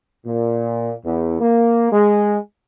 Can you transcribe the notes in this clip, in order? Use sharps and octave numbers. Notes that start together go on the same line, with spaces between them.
A#2
E2
A#3
G#3